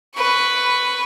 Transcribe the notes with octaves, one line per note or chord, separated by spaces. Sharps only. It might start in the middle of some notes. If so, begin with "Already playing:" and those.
B4 C#6